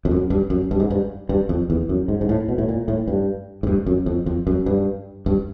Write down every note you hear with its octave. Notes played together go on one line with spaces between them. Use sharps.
F2
F#2
G2
F#2
G2
G#2
G2
G2
F2
E2
F#2
G#2
G#2
A2
B2
A2
A#2
A2
G2
G#2
G2
F#2
F2
F2
F#2
G2
G2